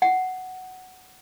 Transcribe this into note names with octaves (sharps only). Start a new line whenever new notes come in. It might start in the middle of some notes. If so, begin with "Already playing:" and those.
F#5